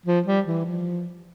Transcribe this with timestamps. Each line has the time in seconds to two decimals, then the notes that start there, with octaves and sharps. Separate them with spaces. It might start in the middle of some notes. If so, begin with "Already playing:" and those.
0.06 F3
0.26 G3
0.46 E3
0.65 F3